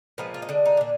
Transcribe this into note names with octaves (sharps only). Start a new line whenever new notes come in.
A#2 F3 G#3 B3
F4
D#4
D3 G#3 D4
D#4
A#2 D4